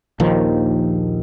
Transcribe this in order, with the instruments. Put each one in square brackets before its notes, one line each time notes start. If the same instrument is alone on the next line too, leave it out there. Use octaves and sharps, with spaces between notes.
[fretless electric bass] A#1 D#2 D#3 F3